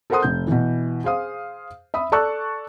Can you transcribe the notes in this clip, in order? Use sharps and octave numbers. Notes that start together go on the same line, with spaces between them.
A4 A#4 C5 F#5 C6 D#6
F1 G6
B2 E3
G#4 C5 F5 D#6
E5 B5 D#6
A4 D5 A5 C#6 E6 F#6